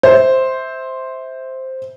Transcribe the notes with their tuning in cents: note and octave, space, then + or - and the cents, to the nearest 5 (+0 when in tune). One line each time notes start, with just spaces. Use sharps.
C5 +0 E5 -20